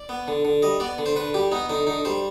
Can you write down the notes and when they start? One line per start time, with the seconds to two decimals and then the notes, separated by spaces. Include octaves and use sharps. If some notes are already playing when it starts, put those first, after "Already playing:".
Already playing: D5
0.09 B3
0.28 D3
0.45 D3
0.63 G3 D#5
0.80 B3 D5
0.98 D3
1.06 C5
1.16 D3 B4
1.34 G3 G4
1.52 B3 D#4
1.69 D3 D#4
1.87 D3 D#4
2.05 G3 C5